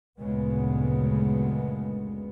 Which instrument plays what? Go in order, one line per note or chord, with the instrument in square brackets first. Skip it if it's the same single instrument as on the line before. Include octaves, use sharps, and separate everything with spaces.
[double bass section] F#1 D2 A#2 C#3 G#3 B3